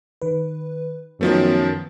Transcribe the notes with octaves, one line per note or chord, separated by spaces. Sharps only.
D#3 B4
F#2 D#3 F3 A3 B3